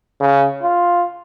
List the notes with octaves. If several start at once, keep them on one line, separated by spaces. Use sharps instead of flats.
C#3
F4